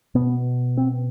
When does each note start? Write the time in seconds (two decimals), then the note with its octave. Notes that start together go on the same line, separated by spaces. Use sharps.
0.15 B2 B3
0.77 C4